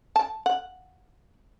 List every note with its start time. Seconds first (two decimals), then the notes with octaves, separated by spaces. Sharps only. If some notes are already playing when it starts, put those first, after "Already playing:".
0.16 A5
0.46 F#5